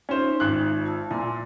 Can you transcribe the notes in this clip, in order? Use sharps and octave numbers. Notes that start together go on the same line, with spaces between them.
C#4 D#4 F4 C5 E5
G#1 F#6
F4 A5 E6
A#2 E5 G#5 C6